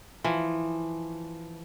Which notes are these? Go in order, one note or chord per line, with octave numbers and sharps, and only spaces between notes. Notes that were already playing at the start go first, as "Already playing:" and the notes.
E3 F3